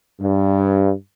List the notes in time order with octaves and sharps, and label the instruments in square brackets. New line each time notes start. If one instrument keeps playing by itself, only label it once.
[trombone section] G2